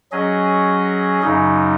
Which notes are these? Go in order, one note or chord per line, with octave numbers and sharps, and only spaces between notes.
F#3 C#4 G#4 D#5
F#2 C#3 F#3 D#4